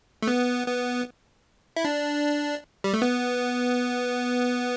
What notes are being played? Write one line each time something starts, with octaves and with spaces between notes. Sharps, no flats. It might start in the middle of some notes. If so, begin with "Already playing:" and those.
A3
B3
B3
E4
D4
G3
A3
B3